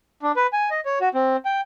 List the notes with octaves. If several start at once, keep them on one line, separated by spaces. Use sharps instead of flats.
D4
B4
G#5
D#5
C#5
F#4
C4
G5